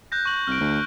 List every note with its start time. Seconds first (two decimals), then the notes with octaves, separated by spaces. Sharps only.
0.12 F#6 G6 A#6
0.25 C#6 F#7
0.47 C2 F6 D7
0.60 D2